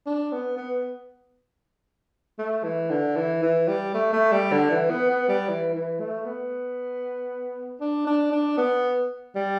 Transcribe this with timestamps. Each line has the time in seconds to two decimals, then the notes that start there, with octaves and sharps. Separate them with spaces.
0.07 D4
0.32 B3
0.57 B3
2.38 A3
2.64 E3
2.90 D3
3.16 E3
3.42 E3
3.68 G3
3.94 A3
4.13 A3
4.32 G3
4.52 D3
4.71 E3
4.90 B3
5.10 B3
5.29 G3
5.49 E3
5.74 E3
6.00 A3
6.25 B3
7.81 D4
8.07 D4
8.32 D4
8.58 B3
9.36 G3